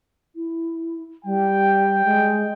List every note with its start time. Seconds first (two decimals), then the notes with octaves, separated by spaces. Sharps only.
0.36 E4
1.25 G3 G5
2.05 G#3